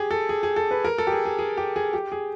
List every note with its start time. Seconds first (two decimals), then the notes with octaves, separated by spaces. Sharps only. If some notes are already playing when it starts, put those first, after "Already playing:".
Already playing: G4 G#4
0.11 A4
0.29 G#4
0.43 G#4
0.56 A4
0.71 B4
0.84 A#4
0.98 A4
1.07 G4
1.12 G#4
1.25 G#4
1.39 G#4
1.57 G4
1.76 G#4
1.93 G4
2.12 G#4